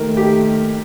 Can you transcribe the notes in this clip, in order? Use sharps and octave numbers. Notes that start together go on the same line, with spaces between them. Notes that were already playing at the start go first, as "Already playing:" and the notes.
Already playing: D#2 D#3 A3 A#4
G4